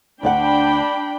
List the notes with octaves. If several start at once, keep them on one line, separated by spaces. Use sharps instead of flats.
D2 D4 D5 F#5 G5 B5